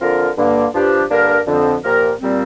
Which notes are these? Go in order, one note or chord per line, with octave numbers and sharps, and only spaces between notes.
D3 F3 C4 F4 A#4
G2 D3 A#3
G2 F3 D4 G4
G2 D3 A#3 D4 A#4
F2 D3 F3 C4
A#2 F3 A#3 G4 A#4
A#2 G3 C4